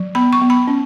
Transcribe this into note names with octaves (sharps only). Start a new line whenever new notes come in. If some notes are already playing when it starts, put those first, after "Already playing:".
Already playing: F#3
B3 B5
C#6
B3
B5
C#4